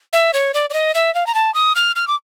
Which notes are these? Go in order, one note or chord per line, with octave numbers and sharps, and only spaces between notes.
E5
C#5
D5
D5
D#5
E5
F5
A#5
A5
D#6
F6
F6
D6